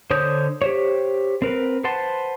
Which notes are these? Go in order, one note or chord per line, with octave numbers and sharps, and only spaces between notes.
D3 C5 C#5 D#6 G6
G4 C5 C#5
C4 A#4 B4
B4 C5 F#5 A5 C6